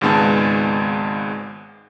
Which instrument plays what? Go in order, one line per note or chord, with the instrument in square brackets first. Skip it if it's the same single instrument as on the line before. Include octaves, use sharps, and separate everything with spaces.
[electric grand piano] G#1 C#2 G#2 G#3 B3 A5